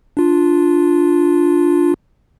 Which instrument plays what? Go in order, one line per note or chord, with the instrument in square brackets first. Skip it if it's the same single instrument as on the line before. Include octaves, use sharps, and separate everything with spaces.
[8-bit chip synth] D4 F4